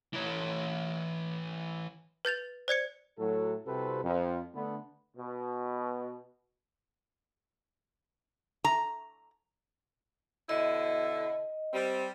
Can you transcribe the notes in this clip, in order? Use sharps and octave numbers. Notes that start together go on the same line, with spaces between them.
E3 C#5
B4 G6 A6 F7
C5 D5 G#6 C#7
A2 F#3 A4
C2 C3 C4 F#4 A4 B4
F2
D3 A3 B3
B2
A#5
B2 D3 E4 D#5
G3 C4